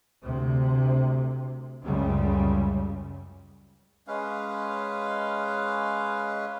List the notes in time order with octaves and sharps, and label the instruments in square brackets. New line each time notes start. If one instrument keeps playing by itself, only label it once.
[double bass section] D2 C3
C#2 F#2 C#3 G3
[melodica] G#3 C#4 B4 F5